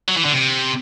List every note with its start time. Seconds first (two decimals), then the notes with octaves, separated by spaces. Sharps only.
0.08 F#3
0.17 E3
0.25 D3
0.33 C3